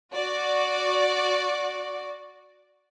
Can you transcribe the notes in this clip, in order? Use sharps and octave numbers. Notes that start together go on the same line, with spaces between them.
F#4 D5